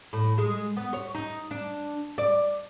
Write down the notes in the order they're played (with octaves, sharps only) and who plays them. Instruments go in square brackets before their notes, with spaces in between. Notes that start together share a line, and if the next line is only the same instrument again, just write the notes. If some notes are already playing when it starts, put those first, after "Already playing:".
[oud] A2
G#3
B3
C#5
D#4
D4
D5